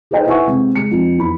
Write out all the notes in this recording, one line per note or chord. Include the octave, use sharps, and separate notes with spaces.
G#4 A4 B4 C5 D#5 G5
E4 B4 E5 F#5 G#5 C#6
C3 G#3 C4
G#3 C#7
F2
E2 B5